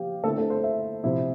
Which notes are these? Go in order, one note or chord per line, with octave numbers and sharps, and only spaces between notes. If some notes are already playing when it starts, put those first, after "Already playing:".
Already playing: F3 G4 F5
D3 A3 C4 E4 A4
A4
C5
E5
C3 F3 C4 E4